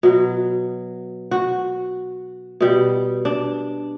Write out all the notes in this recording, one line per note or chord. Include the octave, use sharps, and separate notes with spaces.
B2 F#3
F#4
B2 G3
D4